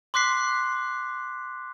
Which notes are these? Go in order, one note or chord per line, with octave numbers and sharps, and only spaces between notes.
C6 D6 F#6 B6 C7